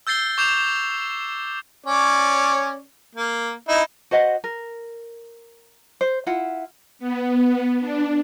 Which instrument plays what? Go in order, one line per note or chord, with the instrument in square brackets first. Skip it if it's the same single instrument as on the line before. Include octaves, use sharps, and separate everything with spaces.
[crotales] E6 G6 A6 C7 G7
C#6 D6 G6 C7 E7 F7
[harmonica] C#4 C#5 D5
A#3
D#4 E4
[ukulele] F#4 C5 D#5 F#5
A#4
C5
E4 F4 F#5
[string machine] B3
D4